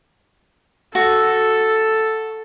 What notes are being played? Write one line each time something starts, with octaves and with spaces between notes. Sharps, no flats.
F#4 A4